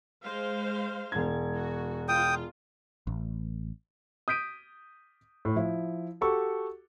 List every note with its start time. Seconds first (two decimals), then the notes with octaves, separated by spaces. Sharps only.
0.23 G#3 C5 F5
1.12 E1 G#6
1.54 F#4
2.08 F4 G5 D#6
3.07 A1
4.28 D#6 G6 B6 D7 D#7
5.45 A2
5.56 F3 E4
6.21 F#4 G4 A4 C#6